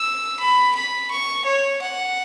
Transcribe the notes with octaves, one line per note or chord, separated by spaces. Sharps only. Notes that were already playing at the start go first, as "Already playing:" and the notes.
Already playing: E6
B5
B5
C#6
C#5
F#5